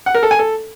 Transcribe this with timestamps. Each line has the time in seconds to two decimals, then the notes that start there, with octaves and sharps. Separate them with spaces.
0.06 F#5
0.15 A#4
0.23 A4
0.31 G#5
0.39 A4